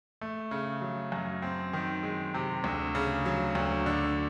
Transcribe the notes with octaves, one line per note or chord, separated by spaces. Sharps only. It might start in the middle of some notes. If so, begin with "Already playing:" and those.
A3
C#3
F#3
F#2
C4
D#3
G#3
C3
D2
C#3
F#3
D2
D3